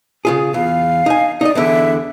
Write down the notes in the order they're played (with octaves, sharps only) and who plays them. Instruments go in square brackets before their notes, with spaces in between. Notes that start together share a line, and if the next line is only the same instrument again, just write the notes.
[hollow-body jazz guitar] C#3 F4 G#4
[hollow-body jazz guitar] E2 [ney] F5
[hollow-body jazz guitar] D#4 G#5
[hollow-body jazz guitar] D#4 D#5 [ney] D5
[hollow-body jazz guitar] E2 D3 [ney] E5